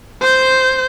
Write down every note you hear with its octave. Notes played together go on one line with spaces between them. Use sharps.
C5 G6